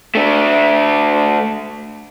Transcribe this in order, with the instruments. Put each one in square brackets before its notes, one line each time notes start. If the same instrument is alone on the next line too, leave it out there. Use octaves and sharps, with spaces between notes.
[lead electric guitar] A3 D4